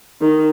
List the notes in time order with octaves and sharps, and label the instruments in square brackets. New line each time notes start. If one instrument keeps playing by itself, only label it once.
[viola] D#3